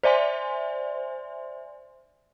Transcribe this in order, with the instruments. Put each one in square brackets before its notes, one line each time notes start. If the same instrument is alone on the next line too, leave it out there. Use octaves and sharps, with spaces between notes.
[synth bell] C5 D5 E5 G#5 C6